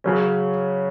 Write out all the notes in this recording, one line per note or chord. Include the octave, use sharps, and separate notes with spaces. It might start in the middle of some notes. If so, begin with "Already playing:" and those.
C#3 F#3 C#4